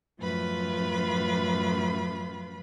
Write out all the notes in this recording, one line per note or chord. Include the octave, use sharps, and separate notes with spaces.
F#2 A2 F3 F4 B4 B5